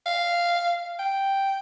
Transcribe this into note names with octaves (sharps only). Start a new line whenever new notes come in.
F5
G5